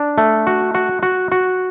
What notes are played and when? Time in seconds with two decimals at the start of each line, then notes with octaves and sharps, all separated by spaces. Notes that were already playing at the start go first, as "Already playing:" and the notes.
Already playing: D4
0.18 A3
0.47 F#4
0.75 F#4
1.03 F#4
1.32 F#4